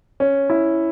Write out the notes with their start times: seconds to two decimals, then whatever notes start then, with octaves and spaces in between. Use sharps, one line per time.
0.20 C#4
0.50 E4